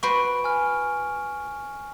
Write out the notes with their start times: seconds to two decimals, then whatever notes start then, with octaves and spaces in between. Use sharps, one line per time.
0.03 F#4 B4 C5 C#6 D7
0.44 G#5 F6